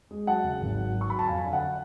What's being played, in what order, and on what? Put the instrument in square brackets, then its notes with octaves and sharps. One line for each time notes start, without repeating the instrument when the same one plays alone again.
[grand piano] G#3
F#3 F#5 A5
C#3
G#1
F#3
F#3
C#6
F#3 B5
A5
F2 F5 G#5
D3
F#5